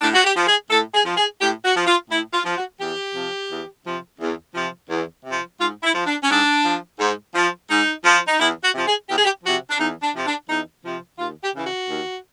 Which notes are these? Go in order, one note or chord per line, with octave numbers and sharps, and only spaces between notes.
A2 D4
F#4
G4
F3
G#4
A2 A4
G#4
F3
G#4
A2 G4
F#4
F3
F4
A2 E4
F4
F3
F#4
E2 G4
C3 F3
E2
C3 F3
E2
C3 F3
E2
C3 F3
G#2 F4
E4
F3
D4
C#4
G#2 D4
F3
G#2
F3
G#2 D#4
F3
D#4
E2 E4
F#4
C3 F3
G#4
E2 G4
G#4
G4
C3 F3 F#4
D4
E2 D#4
D4
C3 F3
D4
E2 D#4
C3 F3
D#2 F4
G4
C#3 E3
F#4
D#2